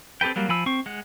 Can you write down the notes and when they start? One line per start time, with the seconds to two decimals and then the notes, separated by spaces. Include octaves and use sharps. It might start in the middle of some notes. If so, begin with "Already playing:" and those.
0.21 C4 G4 A4 B4 G5
0.36 F#3 G3 A#3
0.49 F3 G#5 B5 E6
0.66 C4 C#6
0.86 G#3 F#5